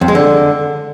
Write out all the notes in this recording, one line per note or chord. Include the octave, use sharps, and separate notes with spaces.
F2
G#3
D3